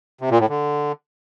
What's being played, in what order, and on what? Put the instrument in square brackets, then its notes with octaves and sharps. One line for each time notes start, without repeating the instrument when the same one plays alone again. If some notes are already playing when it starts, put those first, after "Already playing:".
[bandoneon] C3
A#2
A2
D3